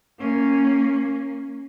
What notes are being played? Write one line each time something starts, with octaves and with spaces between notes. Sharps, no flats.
A#3 C#4